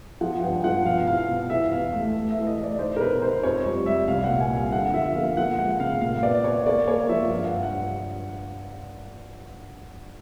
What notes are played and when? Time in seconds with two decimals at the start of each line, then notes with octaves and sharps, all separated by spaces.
0.21 F3 F#5
0.38 F#5
0.42 G2 G5
0.64 F3 F#5
0.86 B2 F5
1.07 E4 F5
1.28 B2
1.50 E3 E5
1.71 E2 F5
1.93 A3
2.15 A3
2.31 E5
2.37 E3
2.47 D#5
2.57 A3
2.63 D5
2.79 D#4 C5
2.96 A#4
3.00 B2 B4
3.22 D#4 C5
3.43 F2 C#5
3.65 G3
3.86 G3 E5
4.08 C2 F5
4.24 F#5
4.29 A#2
4.40 G#5
4.51 G3
4.56 F5
4.72 D3 F#5
4.94 F3 E5
5.06 E5
5.15 A#3 F5
5.37 F3 F#5
5.58 G#3 F#5
5.80 C#3 F5
6.01 A#2 F5
6.23 B3 D5
6.44 B3 C#5
6.66 A#3 D5
6.87 A#3 C#5
7.09 F3 E5
7.30 G2 F5
7.47 F#5
7.52 G2
7.63 F#5